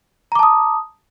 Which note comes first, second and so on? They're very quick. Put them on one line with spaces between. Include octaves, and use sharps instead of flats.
A#5 D6 A5 D#6